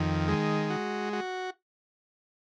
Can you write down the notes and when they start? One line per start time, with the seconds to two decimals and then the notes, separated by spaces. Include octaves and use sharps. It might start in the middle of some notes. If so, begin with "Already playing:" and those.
Already playing: F2 D#3
0.28 G#3
0.70 F#4
1.13 F#4